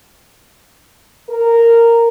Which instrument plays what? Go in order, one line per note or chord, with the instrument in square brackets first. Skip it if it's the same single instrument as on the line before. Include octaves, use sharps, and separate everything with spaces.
[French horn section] A#4